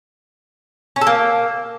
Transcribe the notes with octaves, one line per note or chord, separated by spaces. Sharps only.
C#4
A4
A#3